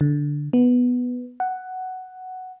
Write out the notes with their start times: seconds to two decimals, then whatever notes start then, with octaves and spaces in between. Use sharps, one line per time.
0.01 D3
0.53 B3
1.40 F#5